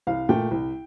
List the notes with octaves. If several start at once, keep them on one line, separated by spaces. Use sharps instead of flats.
C2 F5
A#2 A3 G5
C2